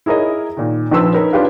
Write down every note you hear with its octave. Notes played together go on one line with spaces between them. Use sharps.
E4 G#4 A#4 C#5 D#5
A#2 D#3
A#1 F3 B4 C6 E6
C#4 D#4 A#4 B4
C#4 D4 F4 G4 B4 F5